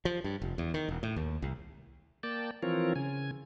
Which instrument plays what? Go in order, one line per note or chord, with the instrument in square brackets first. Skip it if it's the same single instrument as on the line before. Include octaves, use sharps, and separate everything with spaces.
[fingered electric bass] F3
G2
F1
E2
D#3
E1
A2
D#2
C2
[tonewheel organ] A#3 D5 G5 A5
E3 F3 C4 F4 A#4 C#5
C#3 G#5